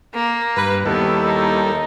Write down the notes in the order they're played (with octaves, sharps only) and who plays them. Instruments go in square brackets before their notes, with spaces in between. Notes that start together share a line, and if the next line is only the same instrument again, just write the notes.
[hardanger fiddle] A#3
[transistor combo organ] G2 [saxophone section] B4
[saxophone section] D#2 D#3 [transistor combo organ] G3 E4 A4 [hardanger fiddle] B3
[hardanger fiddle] D#4